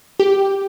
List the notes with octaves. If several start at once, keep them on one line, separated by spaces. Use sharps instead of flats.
G4